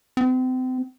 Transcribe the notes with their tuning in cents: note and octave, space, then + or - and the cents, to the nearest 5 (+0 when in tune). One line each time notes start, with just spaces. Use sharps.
C4 -35